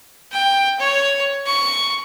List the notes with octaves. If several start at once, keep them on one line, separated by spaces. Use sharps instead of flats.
G5
C#5
C#6